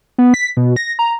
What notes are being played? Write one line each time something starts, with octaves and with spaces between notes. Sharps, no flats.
B3
B6
B2
A#6
A#5